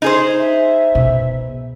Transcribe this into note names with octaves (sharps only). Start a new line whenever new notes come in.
D#4 G#4 C5
E5
B2